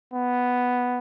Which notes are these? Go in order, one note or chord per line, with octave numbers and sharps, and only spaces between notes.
B3